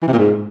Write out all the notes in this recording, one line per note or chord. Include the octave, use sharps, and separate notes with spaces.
E3
C3
A#2
G#2